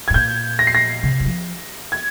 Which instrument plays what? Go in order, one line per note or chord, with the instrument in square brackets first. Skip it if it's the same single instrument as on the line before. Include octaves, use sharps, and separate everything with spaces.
[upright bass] G#2 [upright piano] G#6
[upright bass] A#2 [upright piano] G6
[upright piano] A#6
C7
A#6
[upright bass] C3
D#3
F3
[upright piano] G#6